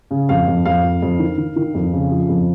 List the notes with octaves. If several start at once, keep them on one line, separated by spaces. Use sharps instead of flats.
C#3
F2 F5
F2
F2 F5
F2
F2
D#3
D#3
D#3
F2
C#3
F3
F2